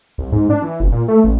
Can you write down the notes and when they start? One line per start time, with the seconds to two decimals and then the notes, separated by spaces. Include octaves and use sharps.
0.18 C2
0.32 G#2
0.50 D4
0.62 E3
0.80 F#1
0.92 A#2
1.08 A3
1.24 A1